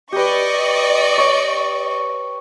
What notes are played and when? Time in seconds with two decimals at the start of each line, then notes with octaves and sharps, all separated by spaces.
0.12 G4 B4 D5 D#5 C#6
1.18 C#5